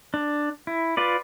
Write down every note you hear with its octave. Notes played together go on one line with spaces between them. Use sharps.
D4
E4
F4 B4 D5